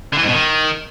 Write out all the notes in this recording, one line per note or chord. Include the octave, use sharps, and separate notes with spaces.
D3
E3
G#2
B2
D#3